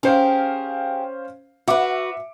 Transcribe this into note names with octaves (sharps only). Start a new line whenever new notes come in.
C#4 G4 G#4 A#4 C5 F5
F#4 B4 E5 D6